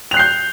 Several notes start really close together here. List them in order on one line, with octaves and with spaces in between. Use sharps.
F7 F#6 C7 G6